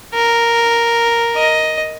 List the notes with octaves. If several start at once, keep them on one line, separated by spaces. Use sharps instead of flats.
A#4
D#5